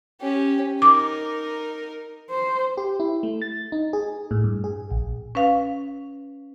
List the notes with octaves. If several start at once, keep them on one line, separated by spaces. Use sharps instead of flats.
C#4 G4
D#4 A#4 D6
C5
G4
E4
A3
A6
D#4
G#4
A2
G2
G#4
A#1
C#4 B4 F5